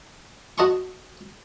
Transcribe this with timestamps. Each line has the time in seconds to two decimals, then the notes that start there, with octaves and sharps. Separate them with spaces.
0.58 F#4 D#5 A5 C6 C#6